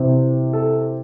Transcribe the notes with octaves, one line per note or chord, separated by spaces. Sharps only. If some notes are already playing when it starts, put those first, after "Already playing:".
Already playing: C3 E3 C4
A4